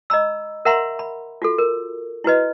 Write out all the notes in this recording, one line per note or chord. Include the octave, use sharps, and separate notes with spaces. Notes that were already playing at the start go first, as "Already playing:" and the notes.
D#5 A#5 B5 E6
A#4 E5 F#5 A#5 C6
B5
F4 F#4 A4
A#4
E4 F#4 B4 D#5